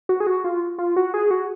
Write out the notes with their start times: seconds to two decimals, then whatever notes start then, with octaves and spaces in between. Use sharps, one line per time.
0.09 F#4
0.20 G#4
0.27 F#4
0.44 F4
0.78 F4
0.96 F#4
1.14 G#4
1.31 F#4